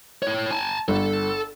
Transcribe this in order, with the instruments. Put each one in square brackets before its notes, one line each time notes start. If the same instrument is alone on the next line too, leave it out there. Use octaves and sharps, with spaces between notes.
[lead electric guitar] E4 C#5
G#5 A5
[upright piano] G1 [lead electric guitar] A4